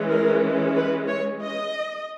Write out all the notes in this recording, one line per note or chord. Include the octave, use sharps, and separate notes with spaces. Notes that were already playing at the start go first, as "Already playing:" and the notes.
Already playing: E3 G#3 C#4
A#4
B4
C#5
D#5